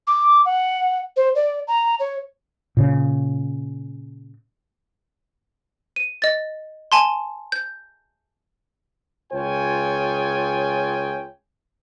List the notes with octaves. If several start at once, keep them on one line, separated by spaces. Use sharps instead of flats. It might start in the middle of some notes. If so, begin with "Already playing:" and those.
D6
F#5
C5
D5
A#5
C#5
A#2 C#3
D#7
D#5 A6
G#5 A5 C6
G6
C#2 F4 G#4 C#5 G5 G#5